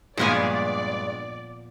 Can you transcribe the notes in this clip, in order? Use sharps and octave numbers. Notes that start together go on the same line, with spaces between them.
G2 A#2 F3 G#3 A#3 B3 D5 G#5